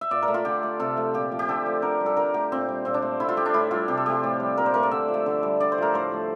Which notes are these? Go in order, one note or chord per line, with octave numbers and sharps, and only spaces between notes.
E5
A#2 D5
A#4
A3
F4
D3 G4
A3
C3 A4
F3 A3
A#2 G4
F3 A3
G4
D3 A4
F3 A3
D3 A#4
G3
A4
D3 A#4
A3 G4
A#2 C4
G3
A#2 C4
D4
A3
D3 E4
F4
A3 G4
D4
A2 E4
G3 F4
C3 G4
A4
F3 A3 G4
A2
G3
A#2 A#4
C5
A3 A#4
D5
D3 E5
F3
A3
D3
G3
D3 D5
C5
F3 A3 A#4
A2 C5
F3 A3